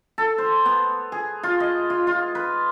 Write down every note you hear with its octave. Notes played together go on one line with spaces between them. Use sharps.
A4
C5
B3
G#4
F4
D#5
F4
F4
B4